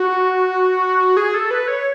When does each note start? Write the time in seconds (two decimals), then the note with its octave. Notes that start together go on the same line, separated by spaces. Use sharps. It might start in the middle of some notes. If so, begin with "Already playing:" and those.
Already playing: F#4
1.17 G#4
1.34 A4
1.51 B4
1.68 C#5